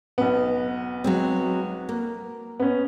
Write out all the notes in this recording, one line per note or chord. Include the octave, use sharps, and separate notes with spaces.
B1 B3
F#3 G#3 C4
A#3
B3 C#4